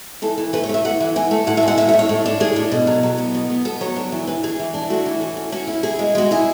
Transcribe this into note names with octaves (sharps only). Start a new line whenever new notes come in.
E3 A4
E3
A3 B4
C#5
A3 E5
E3 F#5
E3
E3 G#5
A3
A2 F#5
E5
G#3 F#5
A2 E5
E5
A2
C#5
A2
D4
D4 G#4
A2
B2
F#3
F#3
B3
B2
B3
B3 A4
F#3 C#5
D4
E3
E3 B4
E3 G#4
E3
D4
A3 F#4
E3
C#4
C#4
C#4 F#4
E4
E4 G#4
G#3
G#3 F#4
E4 G#4